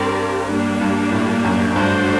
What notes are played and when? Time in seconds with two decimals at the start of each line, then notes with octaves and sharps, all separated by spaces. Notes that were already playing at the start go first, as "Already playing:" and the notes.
Already playing: G2 C4 G4 A#4 D5
0.49 G2 G3 A#3 D4
0.81 G2
1.12 A2
1.45 F#2
1.76 G2 A3 D4 F#4 C5